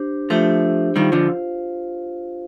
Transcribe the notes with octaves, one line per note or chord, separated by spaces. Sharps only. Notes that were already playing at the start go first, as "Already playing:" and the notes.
Already playing: D4 G4 C5
F3 A3 D4 G4 C5
D#3 G3 F4 C5 F5
D3 F3